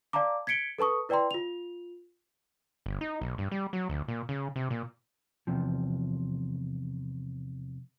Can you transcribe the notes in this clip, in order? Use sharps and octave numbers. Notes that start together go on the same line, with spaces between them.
D5 F5 A5 A#5 D6
G#6 B6 C#7 D7 G7
A4 B4 A5 C#6 D#6
E4 B4 D5 G5 A#5 C6
F4 F7
G1
D#4
B1
G2
G3
F#3
D2
A#2
C#3
C3
A#2
E2 C3 F3